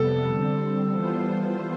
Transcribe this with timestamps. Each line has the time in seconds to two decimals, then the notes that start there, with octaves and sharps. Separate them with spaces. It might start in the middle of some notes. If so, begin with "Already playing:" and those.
Already playing: F2 C3 G3 B3 A4
0.28 D3 G3 C4
0.89 E3 G3 B3 F4 C5